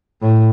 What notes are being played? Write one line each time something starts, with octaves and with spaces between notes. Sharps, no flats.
A2